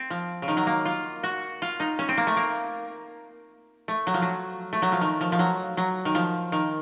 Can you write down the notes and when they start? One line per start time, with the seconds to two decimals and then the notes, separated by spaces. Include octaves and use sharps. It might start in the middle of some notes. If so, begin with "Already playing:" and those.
Already playing: C4
0.10 F3
0.42 C#3
0.48 D#3
0.57 F#3
0.67 A#3
0.85 F4
1.23 F#4
1.62 F4
1.80 D#4
1.99 C#4
2.09 C4
2.17 A#3
2.27 A3
2.37 A#3
3.88 A3
4.07 F#3
4.14 F3
4.22 F#3
4.73 A3
4.82 F#3
4.92 F3
5.01 D#3
5.21 F3
5.32 F3
5.39 F#3
5.77 F#3
6.05 D#3
6.15 F3
6.52 D#3